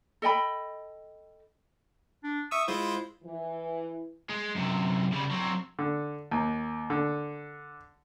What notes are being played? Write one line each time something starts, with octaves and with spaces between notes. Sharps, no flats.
A4 D#5 G5 B5
D4
E5 C#6 D#6 E6
G#3 E4 F4 C5
E3
G#3
F#2 C3
C#3 G3
F#3 C4
D3
D#2
D3